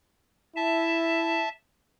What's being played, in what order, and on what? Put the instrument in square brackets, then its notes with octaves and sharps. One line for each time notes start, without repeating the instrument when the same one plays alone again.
[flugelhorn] E4 [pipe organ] E5 A5